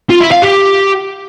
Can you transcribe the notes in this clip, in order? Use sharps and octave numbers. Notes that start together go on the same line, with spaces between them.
F4
E4
F5
G4